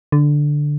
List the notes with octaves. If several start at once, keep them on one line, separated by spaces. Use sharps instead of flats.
D3